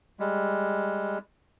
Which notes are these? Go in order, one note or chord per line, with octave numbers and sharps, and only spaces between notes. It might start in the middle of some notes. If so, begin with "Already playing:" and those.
G3 G#3